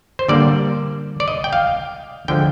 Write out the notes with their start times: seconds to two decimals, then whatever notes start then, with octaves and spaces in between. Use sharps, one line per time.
0.19 C5
0.28 D3 G3 A#3 D5
1.20 D5
1.28 D#5
1.44 G5
1.53 F5
2.28 D3 F3 G#3 G5